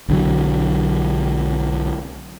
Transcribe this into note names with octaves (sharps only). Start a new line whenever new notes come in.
B1 D3 F#3